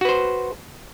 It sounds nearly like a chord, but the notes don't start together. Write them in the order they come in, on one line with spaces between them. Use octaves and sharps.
F#4 B4 C5